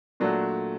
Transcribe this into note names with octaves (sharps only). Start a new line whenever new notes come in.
A#2 F#3 A3 D4 F#4